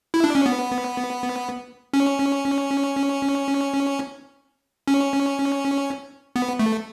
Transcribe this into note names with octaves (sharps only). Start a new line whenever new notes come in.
E4
D4
C#4
B3
C#4
C#4
B3
A3